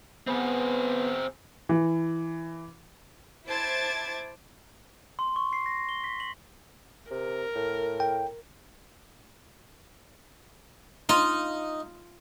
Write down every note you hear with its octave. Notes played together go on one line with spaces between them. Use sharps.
B3 C4 G#4
E3
E4 C5 A5 D6 G#6 A6
C6
C#6
C7
A#6
G7
B6
F#7
C3 A#4
A2
G5
D#4 F4